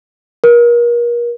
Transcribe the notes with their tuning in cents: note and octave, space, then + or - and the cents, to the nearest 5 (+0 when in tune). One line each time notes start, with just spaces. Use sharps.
A#4 +35